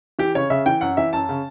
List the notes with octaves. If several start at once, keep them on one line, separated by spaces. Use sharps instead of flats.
E3 G4
C#3 C#5
C#3 E5
E3 G5
F#2 F#5
E3 E5
F#2 A5
C#3